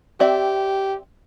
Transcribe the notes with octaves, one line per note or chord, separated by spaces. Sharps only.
C4 G4 D5 E5